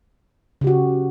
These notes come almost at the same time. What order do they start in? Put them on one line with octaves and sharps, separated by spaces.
C#3 G4 F#4